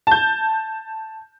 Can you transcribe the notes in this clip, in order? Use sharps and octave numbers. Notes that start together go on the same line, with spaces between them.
A5 G6